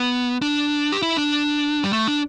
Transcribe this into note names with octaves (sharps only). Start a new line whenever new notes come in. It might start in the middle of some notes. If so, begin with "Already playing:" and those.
Already playing: B3
D4
G4
E4
D4
G3
A3
D4